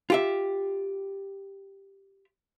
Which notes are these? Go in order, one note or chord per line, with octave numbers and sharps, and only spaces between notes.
F4 G4 E5